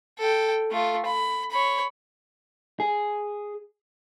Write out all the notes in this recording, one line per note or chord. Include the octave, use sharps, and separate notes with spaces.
A4 G5
A3 F4
B5
C#5 B5
G#4